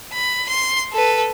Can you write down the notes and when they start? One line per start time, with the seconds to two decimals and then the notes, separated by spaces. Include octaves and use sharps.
0.13 B5
0.49 C6
0.93 A4 B4